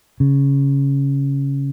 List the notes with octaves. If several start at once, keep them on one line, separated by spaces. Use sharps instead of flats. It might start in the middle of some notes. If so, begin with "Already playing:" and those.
C#3